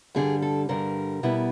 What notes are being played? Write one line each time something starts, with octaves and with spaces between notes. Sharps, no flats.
G2 D3 G3 G#4
A4
G2 D3 G3 A#4
B2 G3 B3 E4